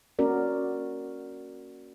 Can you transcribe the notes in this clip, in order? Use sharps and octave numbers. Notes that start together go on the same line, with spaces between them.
A#3 C#4 F#4 A#4 D5